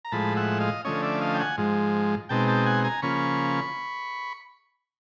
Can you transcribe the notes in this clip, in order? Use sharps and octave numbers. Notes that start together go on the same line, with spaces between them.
A#5
A2 F3 G#3 A5 B5
E5 F#5
D#5 F5
D3 F3 A3 C#4 C#5 D#5
D5 E5
D#5 F5
G5
F#5 G#5
G#2 F3 G#3
B2 G#3 C4 D#4 G5 A5
G5 A5
F#5 G#5
G#5 A#5
C#3 F3 A#3 C#4 B5 C#6